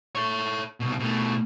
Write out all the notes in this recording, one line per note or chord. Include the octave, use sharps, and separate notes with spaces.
A4 C#5
C2 B2
B2 A3